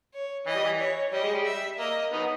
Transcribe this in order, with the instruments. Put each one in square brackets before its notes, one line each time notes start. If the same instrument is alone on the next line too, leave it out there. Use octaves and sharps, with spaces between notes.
[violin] C#5
[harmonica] E3 [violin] D#5
[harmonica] G3
E3
[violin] C#5
[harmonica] G3 [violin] D#5
[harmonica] G#3
G3
[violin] E5
[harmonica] A#3 [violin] D#5
[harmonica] B3 D#4